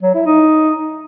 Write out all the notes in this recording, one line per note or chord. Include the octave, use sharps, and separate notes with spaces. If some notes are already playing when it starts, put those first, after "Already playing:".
F#3
E4
D#4